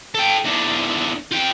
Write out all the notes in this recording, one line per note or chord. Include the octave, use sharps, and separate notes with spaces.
A4 G5
E2 D3
F4 G5